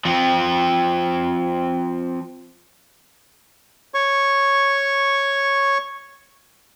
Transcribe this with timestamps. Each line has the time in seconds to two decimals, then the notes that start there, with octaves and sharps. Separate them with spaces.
0.05 F3 C4
3.94 C#5 C#6